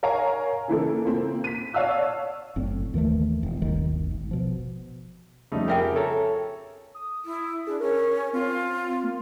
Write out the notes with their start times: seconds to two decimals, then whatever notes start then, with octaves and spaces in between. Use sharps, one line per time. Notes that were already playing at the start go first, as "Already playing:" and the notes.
0.03 A#4 C#5 F5 G#5 A#5
0.68 C#3 E3 A#3 A4
1.05 A#3 C4 F4
1.44 B6 D#7
1.74 C#5 D5 F5 A5 E6 F#6
2.56 F#1 A2 C4
2.94 D#2 D#3 E3 A3
3.43 E1
3.62 D1 G1 D#2 D#3
4.11 G#1
4.31 B2 F3
5.52 F2 C#3 G3 A3 D#4
5.68 F4 G4 G#4 A#4 E5 G5
5.96 A4 C#5 A#5
6.95 D#6
7.25 E4
7.67 D4 G#4
7.80 C#4 A#4
8.33 C4 F4
9.03 A#3